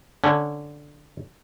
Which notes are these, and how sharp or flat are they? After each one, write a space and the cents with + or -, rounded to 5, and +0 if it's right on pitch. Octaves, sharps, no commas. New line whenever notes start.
D3 +0 C#4 -5